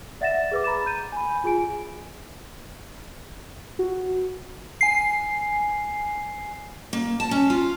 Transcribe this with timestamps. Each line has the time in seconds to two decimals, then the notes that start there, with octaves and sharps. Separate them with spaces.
0.21 D5 E5 F#5 A6 A#6 E7
0.51 G#4 B4 D6
0.64 A#5 B5 A6 E7
0.86 G6 D#7
1.12 G#5 B5
1.44 F4 G#4 G#5 D7
3.79 F#4
4.81 G#5 C7
6.93 A#3
7.20 A5
7.31 C#4
7.50 F4